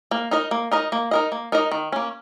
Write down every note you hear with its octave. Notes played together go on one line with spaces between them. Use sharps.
A#3
D#4 A#4 D#5
A#3
D#4 A#4 D#5
A#3
D#4 A#4 D#5
A#3
D#4 A#4 D#5
D#3
A#3 C#4